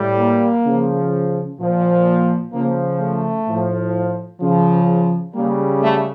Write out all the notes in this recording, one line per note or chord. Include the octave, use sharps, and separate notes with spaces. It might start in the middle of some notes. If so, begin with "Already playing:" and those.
Already playing: A2 G3
A#3
C#3 F3
A#2 F3
C#3 F3 A#3
A3
A2 F3
C#3 F3
C#3 G3 A#3
A3